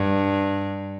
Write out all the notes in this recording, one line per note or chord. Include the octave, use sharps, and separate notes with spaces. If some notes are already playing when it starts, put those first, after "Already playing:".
Already playing: G2